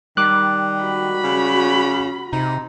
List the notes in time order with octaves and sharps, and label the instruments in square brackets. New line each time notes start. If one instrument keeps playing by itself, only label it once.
[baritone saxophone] D#3 [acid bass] G3 [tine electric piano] D6 F#6
[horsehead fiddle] F#4 B5
[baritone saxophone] C#3
[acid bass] C3 [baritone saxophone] D#4